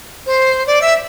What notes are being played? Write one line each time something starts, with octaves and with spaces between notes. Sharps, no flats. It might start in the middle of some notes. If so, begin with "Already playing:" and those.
C5
D5
E5